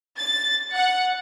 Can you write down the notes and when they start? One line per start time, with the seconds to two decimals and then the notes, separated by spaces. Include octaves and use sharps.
0.17 A6
0.73 F#5